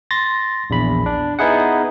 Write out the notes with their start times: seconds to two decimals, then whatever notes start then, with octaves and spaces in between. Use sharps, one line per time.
0.11 C6 A6 A#6
0.70 A#1 E2 B5
1.06 D4
1.39 B3 D#4 E4 G#4 F#5